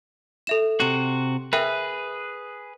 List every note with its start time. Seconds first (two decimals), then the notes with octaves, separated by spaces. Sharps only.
0.47 A4 E5 E7
0.80 C3 F#4
1.53 G#4 A#4 B4 E5 G5